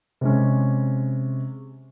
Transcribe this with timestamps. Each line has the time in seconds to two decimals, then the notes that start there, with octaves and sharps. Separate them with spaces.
0.21 C3 G#3 C#4